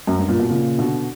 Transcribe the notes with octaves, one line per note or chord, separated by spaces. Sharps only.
F#2
G2
A#2
B2
A#2 C#3
B2 D3